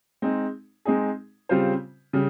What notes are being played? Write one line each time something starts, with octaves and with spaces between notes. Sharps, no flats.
G#3 C4 D#4 G#4
G#3 C4 D#4 G#4
C#3 G3 C4 F4 C5
C#3 G3